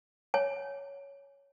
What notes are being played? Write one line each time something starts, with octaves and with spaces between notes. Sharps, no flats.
C#5 G#5